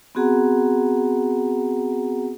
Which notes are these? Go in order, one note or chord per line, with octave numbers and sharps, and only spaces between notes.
B3 C4 F#4 G#4 F#5 A#5